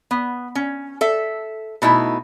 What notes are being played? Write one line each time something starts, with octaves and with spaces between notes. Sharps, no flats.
B3
C#4
A4 E5
B2 A3 D#4 E4